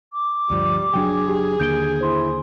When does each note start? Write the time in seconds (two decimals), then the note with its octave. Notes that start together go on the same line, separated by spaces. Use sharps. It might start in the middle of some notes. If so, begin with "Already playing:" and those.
0.13 D6
0.50 D2 G2 F3 G3
0.93 F#1 F#3 D4 G#4 G5
1.28 G4
1.60 D#2 D3 A#3 G6 D7 G7
2.01 E4 C5 C6